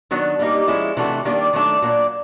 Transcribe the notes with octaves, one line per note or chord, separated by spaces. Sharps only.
D#3 F#3 B3 D4
G3 A#3 D#4 G4
F3 G#3 C#4 E4
C3 E3 A3 D4 F#4
D#3 G3 A#3 D4 G4
D#3 F#3 A3 D4
A#2 F#3 A#3 D4